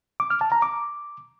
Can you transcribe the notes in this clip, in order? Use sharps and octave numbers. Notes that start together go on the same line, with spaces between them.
D6
F6
A5
A#5
D6